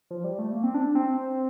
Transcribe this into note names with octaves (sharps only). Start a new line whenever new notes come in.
F3
G3
A3
A#3
C4
D4
C4